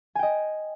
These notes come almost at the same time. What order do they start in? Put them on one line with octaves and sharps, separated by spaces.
G#5 G5 D#5